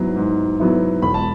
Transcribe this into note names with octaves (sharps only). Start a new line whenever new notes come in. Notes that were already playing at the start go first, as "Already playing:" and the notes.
Already playing: G#2 F#3 B3 E4
G#2
F#3 B3 E4
E1 B5
A5